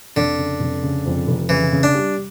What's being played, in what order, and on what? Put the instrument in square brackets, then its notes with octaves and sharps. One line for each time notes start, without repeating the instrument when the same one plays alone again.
[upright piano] F1 [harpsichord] D3
[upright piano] C#3
F1
C#3
F2
F1
[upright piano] C#3 [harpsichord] E3
[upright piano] C#3
[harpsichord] D4
[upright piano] G3